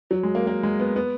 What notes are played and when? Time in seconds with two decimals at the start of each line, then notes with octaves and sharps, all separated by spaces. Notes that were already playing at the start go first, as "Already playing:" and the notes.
0.11 F#3
0.23 G#3
0.35 A#3
0.47 A#3
0.63 G#3
0.80 B3
0.96 B3